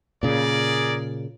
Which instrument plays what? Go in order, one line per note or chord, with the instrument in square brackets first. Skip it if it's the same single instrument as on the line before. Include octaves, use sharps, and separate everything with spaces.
[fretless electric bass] A#2 C#3 [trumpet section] G#4 A#4 D5